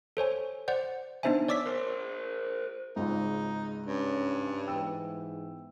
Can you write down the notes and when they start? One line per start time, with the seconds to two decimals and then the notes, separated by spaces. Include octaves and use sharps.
0.17 A4 C5 C#5 G#5
0.68 C5 D5 F#5 G6
1.23 B3 D4 D#4 C5 E5 G#5
1.48 C#5 D5 D6 E6 B6
1.66 A#4 C5
2.96 G#1 C#2 G#2 D#4
3.86 G2 C#4
4.67 G#2 E3 B3 G5 E6